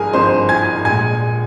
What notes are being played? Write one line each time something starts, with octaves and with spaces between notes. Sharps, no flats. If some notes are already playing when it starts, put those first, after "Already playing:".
Already playing: G#1 G2 F3 G#4 A#4 G#5 A#5
G#1 G2 F3 C5 C6
G#5 G#6
A#1 A#2 G#3 G#5 G#6